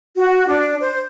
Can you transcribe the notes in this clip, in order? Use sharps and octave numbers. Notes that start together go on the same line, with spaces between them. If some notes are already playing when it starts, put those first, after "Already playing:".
F#4
D4
C5